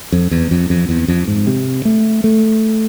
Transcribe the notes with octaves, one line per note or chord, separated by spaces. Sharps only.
F2
E2
F2
F2
E2
F2
G#2
C3
A3
A3